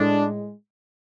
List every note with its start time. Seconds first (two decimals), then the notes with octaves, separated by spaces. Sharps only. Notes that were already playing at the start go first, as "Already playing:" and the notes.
Already playing: A2 G#3 D4